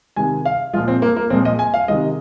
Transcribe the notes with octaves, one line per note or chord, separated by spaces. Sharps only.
C3 D#3 G#3 G#5
F5
A#2 F3 G#3 F4
C4
A#3
A#3
A#2 F3 G#3 C4
D#5
G#5
F5
C3 D#3 G#3 D#5